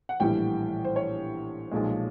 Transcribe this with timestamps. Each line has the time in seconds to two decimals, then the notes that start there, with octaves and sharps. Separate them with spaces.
0.09 F#5
0.20 A#1 A2 E3 G3 G5
0.85 C5
0.96 C#5
1.71 B1 A#2 F3 G#3